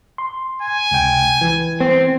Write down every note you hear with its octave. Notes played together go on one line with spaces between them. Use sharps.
C6
G#5
C#2 C3 G5
E3
C4